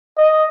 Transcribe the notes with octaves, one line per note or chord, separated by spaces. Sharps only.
D#5